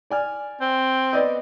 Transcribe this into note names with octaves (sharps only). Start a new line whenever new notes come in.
D5 G#5 F6
C4
B3 D5 D#5